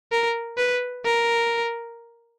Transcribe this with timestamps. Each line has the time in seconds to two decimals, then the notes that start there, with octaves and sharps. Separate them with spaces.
0.12 A#4
0.57 B4
1.05 A#4